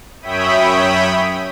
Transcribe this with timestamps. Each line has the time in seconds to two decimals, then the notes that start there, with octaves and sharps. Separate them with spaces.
0.22 F#2 C#5 E5 G5 B5 D#6